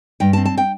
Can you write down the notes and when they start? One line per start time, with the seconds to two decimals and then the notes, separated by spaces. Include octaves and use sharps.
0.20 G2 G5
0.33 A5
0.37 C4
0.45 A5
0.58 G5